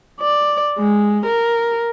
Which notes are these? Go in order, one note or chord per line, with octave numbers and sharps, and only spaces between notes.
D5
G#3
A#4